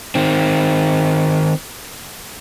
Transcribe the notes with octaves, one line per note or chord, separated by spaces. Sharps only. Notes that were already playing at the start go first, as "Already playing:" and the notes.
D#3 C4